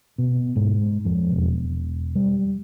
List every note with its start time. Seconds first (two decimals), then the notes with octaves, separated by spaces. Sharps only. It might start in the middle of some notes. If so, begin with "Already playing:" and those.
0.18 B2
0.56 G#2
1.05 F2
1.31 E1
2.15 G3